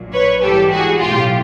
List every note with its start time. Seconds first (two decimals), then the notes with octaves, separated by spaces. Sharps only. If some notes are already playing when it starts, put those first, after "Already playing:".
Already playing: A#1 A#2 F#3
0.12 B4 C#5
0.41 G#2 E3 G3 G4 A4
0.69 F#4 G#4
0.99 B1 A2 F#3 F4 G4